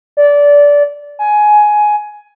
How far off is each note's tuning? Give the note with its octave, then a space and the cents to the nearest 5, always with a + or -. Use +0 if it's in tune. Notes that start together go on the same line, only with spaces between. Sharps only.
D5 -20
G#5 +15